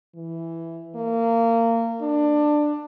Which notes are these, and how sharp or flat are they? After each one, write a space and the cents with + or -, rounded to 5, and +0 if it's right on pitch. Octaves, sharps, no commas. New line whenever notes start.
E3 +5
A#3 -25
D4 +15